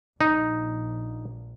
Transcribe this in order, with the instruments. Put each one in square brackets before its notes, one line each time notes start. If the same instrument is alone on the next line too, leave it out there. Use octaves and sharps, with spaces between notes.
[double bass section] A#1 [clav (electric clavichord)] D#4